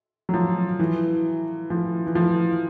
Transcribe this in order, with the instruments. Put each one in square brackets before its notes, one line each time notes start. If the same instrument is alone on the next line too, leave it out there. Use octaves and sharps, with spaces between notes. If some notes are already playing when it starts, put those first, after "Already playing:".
[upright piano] F#3
F3
E3
F3
E3
F3